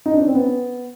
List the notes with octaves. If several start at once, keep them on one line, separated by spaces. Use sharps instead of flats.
D#4
D4
C#4
C4
B3